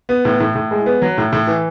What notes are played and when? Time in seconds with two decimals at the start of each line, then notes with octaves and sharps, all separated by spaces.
0.09 B3
0.25 A2
0.40 A2
0.55 A2
0.71 G#3
0.86 B3
1.02 F#3
1.18 A2
1.33 A2
1.47 E3